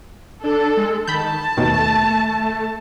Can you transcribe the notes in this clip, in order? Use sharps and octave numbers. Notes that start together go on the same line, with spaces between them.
D4 A4
G#3
D#3 A5 B5 G6
D#2 B2 D#3 A3